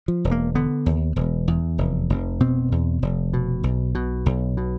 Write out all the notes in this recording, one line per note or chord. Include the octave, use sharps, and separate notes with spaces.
F3
E1
A#3
D3 B3
D#2
E1
E2
F1
F1
B2 C4
E2
F1
B2
B1
B2
B1
B2